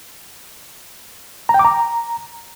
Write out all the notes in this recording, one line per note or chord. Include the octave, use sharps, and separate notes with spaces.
A#5
G5
D6
A#5